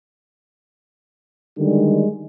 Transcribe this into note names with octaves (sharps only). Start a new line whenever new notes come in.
D3 D#3 G3 G#3